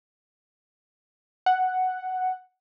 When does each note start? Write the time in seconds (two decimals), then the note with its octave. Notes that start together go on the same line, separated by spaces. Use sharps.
1.46 F#5